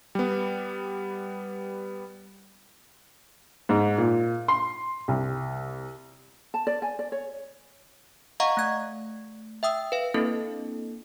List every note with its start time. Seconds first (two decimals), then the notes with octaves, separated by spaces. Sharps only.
0.15 G3 B3
3.69 G#2
3.98 A#2
4.48 C6
5.08 C2
6.54 A5
6.67 D5
6.82 G#5
6.99 D5
7.12 C#5
8.40 D#5 F5 F#5 A#5 C#6
8.57 A3 G#6
9.63 E5 G5 D#6 E6
9.92 B4 F5
10.14 A#3 C4 D4 E4 A4